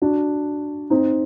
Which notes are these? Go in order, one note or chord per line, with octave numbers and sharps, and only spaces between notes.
D4 F#4
C4 D#4